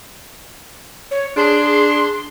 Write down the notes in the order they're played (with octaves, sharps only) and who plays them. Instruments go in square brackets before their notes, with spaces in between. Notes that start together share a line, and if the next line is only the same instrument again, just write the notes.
[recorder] C#5
[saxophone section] D4 G#4 [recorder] C6